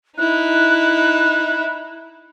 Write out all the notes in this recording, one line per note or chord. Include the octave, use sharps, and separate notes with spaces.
D#4 E4 F#6